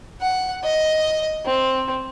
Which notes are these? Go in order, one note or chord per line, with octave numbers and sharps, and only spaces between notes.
F#5
D#5
C4